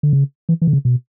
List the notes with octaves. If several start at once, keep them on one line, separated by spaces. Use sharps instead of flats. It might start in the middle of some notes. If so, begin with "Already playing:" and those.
D3
C#3
E3
E3
D3
C#3
B2